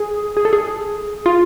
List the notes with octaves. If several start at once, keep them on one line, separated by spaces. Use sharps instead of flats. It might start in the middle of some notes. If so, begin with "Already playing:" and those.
Already playing: G#4
G#4
A4
G#4
F4